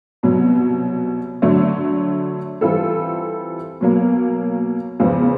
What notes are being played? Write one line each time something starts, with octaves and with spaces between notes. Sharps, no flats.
C2 B2 F#3
D3 F#3 A3 D4
E3 G3 C4 F4 A4
B2 F#3 A#3
E2 C#3 F3 G#3 B3